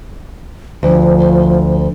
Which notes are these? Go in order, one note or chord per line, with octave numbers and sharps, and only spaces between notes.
D2 F3